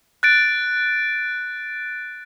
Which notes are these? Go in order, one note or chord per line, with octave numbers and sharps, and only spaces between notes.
F#6 A6 D7